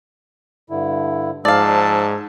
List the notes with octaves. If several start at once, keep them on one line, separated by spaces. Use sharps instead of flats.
G2 D3 E4
G#2 F3 D5 F5 A5 E6